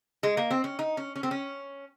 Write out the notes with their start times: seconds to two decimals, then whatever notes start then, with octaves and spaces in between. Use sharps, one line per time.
0.23 G#3
0.37 A#3
0.51 C4
0.64 C#4
0.79 D#4
0.97 C#4
1.16 C#4
1.23 C4
1.31 C#4